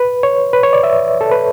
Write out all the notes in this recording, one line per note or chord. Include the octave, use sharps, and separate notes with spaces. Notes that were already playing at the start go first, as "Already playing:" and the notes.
Already playing: B4
C#5
B4
C#5
D5
E5
A4
B4